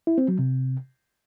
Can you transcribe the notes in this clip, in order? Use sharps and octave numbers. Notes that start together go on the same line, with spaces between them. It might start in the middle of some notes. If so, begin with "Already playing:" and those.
E4
C4
F#3
C3